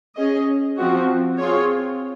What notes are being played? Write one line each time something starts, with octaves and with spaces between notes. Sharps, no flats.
C#4 G#4 D#5
F3 C4 F#4
C4 F4 G#4 C#5